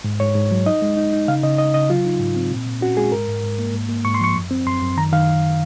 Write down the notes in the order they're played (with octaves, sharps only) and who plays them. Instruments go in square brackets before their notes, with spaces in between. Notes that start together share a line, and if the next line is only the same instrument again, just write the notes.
[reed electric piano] G#2
G#2 C#5
G#2
F#3
D#4 D#5
G#3
D#4
D#4
C#3 F5
C#3 D#5
D#4 D#5
C#3 D#5
F#3 F4
D#4
G#2
C4
A#2
A#2
C#4 F#4
G#3 G#4
G#2 A#4
G#2
G#2
A#3
G#2
A#3
G#2 C#6
C6
F3 C#6
F#2
C4
F#2 C6
F#2
D#3 A#5
D#3 F5